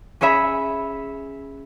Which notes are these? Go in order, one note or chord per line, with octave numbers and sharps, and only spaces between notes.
C#4 G#4 C#5 E5 B5